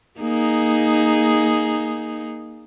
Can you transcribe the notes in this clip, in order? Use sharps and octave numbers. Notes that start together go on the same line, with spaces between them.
A#3 D#4 G#4